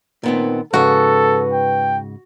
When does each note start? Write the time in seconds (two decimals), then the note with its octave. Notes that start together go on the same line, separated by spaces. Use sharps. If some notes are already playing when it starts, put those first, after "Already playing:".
0.23 A#2 D#3 B3 C4
0.74 G#2 C#3 F#4 A4 B4
1.54 G5